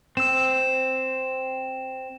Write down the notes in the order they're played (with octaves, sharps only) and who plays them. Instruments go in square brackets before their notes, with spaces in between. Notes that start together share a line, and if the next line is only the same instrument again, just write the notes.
[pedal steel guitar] C4 E6 [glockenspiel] E7